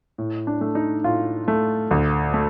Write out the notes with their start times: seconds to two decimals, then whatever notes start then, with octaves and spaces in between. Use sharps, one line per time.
0.18 A2
0.47 D4
0.61 A3
0.75 D#4
1.04 A2 F4
1.48 A3
1.91 D2
2.34 A3